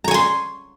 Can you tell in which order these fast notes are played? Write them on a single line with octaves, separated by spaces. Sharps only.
A#5 C#5 G#5 C6